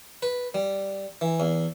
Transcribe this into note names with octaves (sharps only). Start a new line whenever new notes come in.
B4
G3
E3
E2